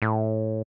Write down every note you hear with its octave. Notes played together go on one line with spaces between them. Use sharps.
A2